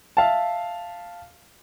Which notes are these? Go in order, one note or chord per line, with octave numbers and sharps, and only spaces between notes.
E5 F5 A5